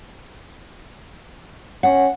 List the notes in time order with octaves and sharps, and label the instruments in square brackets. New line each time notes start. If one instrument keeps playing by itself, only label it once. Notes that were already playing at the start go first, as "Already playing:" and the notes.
[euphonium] C#4 [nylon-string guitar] F#5